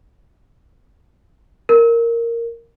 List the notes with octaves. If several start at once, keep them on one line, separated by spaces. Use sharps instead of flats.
A#4